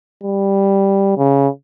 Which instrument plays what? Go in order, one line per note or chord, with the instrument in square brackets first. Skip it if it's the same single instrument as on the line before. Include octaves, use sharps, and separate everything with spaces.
[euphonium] G3
C#3